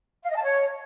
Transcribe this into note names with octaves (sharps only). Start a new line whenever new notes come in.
F5
D#5
A5
C#5